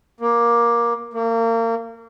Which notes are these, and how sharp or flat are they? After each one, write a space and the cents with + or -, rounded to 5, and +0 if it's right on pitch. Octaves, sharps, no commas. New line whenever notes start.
A#3 +15
A#3 -30